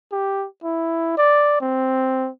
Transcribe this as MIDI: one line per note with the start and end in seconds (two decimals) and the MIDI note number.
0.12 0.46 67
0.63 1.15 64
1.18 1.59 74
1.61 2.29 60